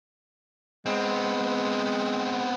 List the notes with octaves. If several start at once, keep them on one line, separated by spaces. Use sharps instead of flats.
G#3 B3 C4